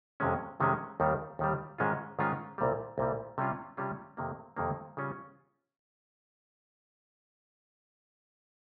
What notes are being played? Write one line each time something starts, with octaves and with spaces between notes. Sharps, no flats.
F2 C3 D#3 G#3 C#4
F2 C3 D#3 G#3 C#4
D#2 D#3 G3
D#2 D#3 G3
G#2 D#3 G#3 C#4 F4
G#2 D#3 G#3 C#4 F4
C2 A#2 G3
C2 A#2 G3
C3 G3 C#4 F4
C3 G3 C#4 F4
F2 C3 D#3 A#3
F2 C3 D#3 A#3
C#3 G3 C#4 F4